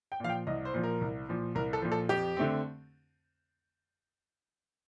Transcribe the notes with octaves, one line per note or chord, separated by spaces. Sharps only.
G5
A#2 F3 F5
G5
C2 D#5
C5
A#2 F3
A#4
C2
A#2 F3
C2 A#4
A4
A#2 F3
A4
F2 G4
D3 A3 C4